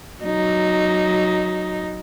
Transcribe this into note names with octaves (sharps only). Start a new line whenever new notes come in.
F#3 D#4